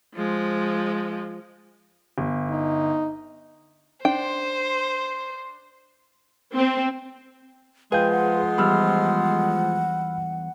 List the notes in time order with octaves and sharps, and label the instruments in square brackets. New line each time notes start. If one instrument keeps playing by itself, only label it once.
[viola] F3 G#3
[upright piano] G1
[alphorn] D#4
[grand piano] D4 [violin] C5 [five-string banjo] G5 [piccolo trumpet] C6
[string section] C4
[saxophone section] F3 G#3 [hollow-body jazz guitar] G#4 [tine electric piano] B4 F5 G6 [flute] G5
[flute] F#5
[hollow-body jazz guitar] E2 G3 [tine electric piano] B5 E6 F6